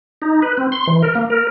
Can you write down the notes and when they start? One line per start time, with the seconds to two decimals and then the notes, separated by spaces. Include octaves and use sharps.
0.22 D#4
0.42 B4
0.57 C4
0.72 C6
0.87 E3
1.03 A#4
1.15 A#3
1.30 A#4